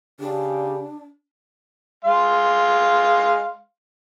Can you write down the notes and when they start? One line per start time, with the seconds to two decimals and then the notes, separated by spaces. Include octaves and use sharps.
0.20 C#3 D4 G4
2.04 G#3 F5 C6